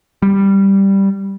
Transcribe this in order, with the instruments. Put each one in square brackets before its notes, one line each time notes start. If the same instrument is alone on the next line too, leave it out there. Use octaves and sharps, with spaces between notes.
[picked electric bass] G3